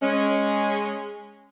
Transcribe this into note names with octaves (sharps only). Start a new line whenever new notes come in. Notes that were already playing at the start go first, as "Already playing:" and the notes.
G#3 C#4